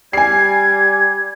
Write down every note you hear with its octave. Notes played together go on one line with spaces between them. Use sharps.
G3 G#5 G#6 C7